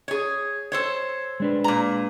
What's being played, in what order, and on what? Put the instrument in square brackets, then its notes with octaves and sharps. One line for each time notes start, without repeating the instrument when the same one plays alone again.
[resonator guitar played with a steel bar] G#4 C#5
A4 C5 C#5
[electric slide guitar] G#3 D4 B4
[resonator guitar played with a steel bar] A#2 A#5